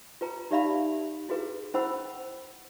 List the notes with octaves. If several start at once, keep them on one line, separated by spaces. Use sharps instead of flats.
F4 B4 A#5
D#4 G4 D5 E5 F5 B5
E4 F#4 G#4 B4
C#4 E4 C5 F#5 B5 E6